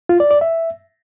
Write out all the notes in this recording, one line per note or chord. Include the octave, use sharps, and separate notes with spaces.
F4
D5
D5
E5